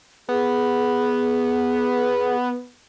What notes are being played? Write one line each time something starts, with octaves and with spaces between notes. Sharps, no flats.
B3 G#4